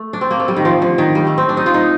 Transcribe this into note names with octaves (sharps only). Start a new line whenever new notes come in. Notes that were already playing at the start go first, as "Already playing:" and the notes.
Already playing: A3
D4
C4
A#3
A3
G3
D#3
F3
D3
D#3
G3
A3
C4
D4
D#4
F4
D#4